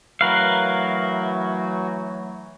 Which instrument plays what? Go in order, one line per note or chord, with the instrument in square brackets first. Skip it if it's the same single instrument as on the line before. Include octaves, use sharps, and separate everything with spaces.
[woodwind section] E3 F#3 A3 [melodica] F#4 [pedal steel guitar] A#4 B4 F5